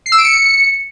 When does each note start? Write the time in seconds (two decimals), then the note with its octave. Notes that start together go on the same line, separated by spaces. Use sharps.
0.06 C7
0.12 E6
0.18 D7
0.24 C#7